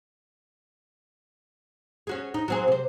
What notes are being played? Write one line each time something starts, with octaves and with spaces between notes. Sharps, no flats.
C#4 F#4 G#4
D#4
F#3 C4 G#4
C3 C5